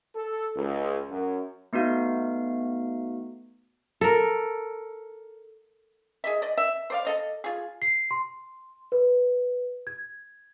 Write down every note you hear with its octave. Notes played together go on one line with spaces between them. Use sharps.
A4
C#2
F#2
A3 B3 D#4 F#4 F5
A4 A#4
G#4 D#5 E5
D5 D#5
E5
C5 D5 F5
A4 D#5 F5
F4 G#4
C7
C6
B4
G#6